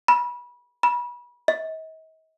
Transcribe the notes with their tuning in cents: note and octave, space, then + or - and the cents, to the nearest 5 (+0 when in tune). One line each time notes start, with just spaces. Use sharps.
B5 -25
B5 -30
D#5 +45